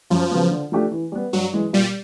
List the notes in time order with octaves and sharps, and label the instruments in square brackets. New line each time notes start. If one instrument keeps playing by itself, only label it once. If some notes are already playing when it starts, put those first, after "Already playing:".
[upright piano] F#2 [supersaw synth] F3
[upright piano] C#3 F#3 B3
D3
F3 A3 D4 G4
E3
G3 B3
[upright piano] G2 [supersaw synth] F#3
[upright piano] E3 G#3
[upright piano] A#2 [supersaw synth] G3